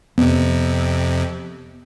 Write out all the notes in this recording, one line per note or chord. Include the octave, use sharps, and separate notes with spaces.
F2 C3 B3